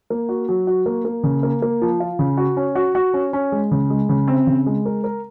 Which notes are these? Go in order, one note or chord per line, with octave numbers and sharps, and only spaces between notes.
A#3
F#4
F#3
F#4
A#3
A#3
C#3
A#3
A#3
F3
F4
C#3
F#4
C#4
F#4
F#4
C#4
C#4
G#3
C#3
G#3
C#3
C4
C#3
G#3
A#4
A#4